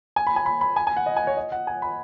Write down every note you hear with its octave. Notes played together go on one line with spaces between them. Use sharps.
G#5
B5
G#5
B5
B5
G#5
G#5
F#5
D#5
G#5
C#5
D#5
F#5
G#5
B5